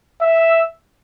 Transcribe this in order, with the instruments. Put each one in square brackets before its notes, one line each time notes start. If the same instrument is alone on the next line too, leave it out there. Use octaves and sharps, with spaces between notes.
[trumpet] E5